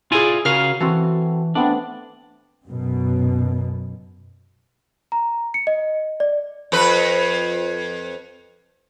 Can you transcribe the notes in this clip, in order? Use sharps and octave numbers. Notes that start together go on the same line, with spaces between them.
E4 F4 G#4 D5 G#5
C#3 F#4 A#4 F5 F6
E3 C4 F#4 A4
A3 B3 C4 D4
F#2 B2
A#5
C#7
D#5
D5
F2 B4